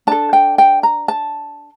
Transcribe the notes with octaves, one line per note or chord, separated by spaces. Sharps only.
D4 A4 A5
G5
G5
A#5
A5